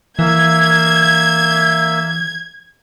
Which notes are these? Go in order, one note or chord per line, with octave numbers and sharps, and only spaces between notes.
E3 A#3 E5 G#6